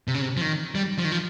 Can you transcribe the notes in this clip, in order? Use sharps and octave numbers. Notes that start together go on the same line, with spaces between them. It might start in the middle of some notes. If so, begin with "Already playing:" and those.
C3
C#3
C3
F3
D#3
G3
F3
D#3
F3